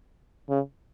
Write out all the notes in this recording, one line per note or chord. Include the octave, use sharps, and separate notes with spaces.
C#3